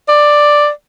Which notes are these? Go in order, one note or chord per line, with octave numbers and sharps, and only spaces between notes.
D5